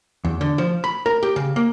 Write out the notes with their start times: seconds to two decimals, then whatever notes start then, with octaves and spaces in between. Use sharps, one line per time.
0.25 E2
0.41 D3
0.58 F3
0.84 B5
1.06 A#4
1.23 G4
1.36 C#3
1.56 A#3